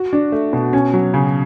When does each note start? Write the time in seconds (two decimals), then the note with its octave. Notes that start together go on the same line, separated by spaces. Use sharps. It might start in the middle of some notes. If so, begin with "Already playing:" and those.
Already playing: F#4
0.13 D4
0.32 A3
0.53 B2
0.73 C#4
0.94 F#3
1.14 C#3